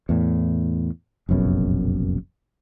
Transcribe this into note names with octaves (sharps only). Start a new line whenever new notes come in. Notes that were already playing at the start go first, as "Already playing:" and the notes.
E2 A2
F1 A#1 F#2 B2